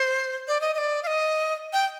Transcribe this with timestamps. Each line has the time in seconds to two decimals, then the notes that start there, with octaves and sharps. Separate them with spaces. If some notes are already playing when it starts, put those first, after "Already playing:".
Already playing: C5
0.48 D5
0.61 D#5
0.74 D#5
0.78 D5
1.03 F5
1.07 D#5
1.73 G5